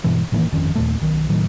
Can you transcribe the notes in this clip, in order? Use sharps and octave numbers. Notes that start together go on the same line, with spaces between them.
G2 B2 E3
A2 D#3 E3 A#3
G1 F2 D#3 C#4
D#2 A#2 A3
B1 D#3
A2 D#3 F#3